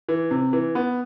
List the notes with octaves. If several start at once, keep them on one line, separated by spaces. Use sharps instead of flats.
E3
C3
E3
B3